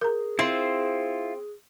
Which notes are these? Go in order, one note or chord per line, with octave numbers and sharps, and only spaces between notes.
G#4 A#4 A#5
C4 E4 F4 C5